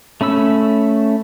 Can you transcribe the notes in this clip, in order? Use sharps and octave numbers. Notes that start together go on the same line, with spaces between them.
A3 C#4 B5 E6